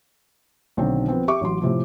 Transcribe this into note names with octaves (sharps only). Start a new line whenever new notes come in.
B1 D3 D#3 C4
F3 B3 C4
G4 E5 C#6 D6
A1 F#3 C6
A2 C3 F3